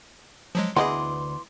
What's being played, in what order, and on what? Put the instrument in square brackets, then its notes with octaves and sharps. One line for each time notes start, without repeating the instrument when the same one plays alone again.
[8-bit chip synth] F3 F#3 G#3
[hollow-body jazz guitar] D2 D#5 [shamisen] E3 B3 [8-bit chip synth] E4 G#4 [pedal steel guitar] C6 D6